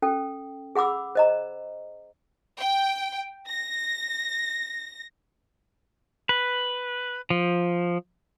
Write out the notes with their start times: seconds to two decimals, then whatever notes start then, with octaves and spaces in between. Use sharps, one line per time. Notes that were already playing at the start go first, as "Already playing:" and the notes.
0.02 C#4 A4 G5
0.75 G#4 F#5 B5 D6 E6
1.15 C5 D#5 A#5
2.58 G5
3.49 A#6
6.29 B4
7.30 F3